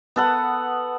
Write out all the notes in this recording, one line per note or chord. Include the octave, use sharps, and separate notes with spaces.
B3 A4 F#5